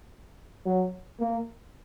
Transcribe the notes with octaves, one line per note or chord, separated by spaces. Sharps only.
F#3
A#3